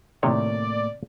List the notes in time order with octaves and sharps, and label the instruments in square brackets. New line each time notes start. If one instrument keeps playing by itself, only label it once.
[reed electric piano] A2 A3 A#3 [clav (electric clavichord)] C3 D#3 C#5 [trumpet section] D5